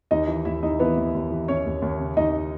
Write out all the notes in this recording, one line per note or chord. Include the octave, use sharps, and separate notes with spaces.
D#2 D#4 D#5
E3
D#2 E4 E5
D#2 D#4 D#5
E3 B3 B4
D#2
D#2
E3
D#2 C#4 C#5
D#2
D#2
C#3
D#2 D#4 D#5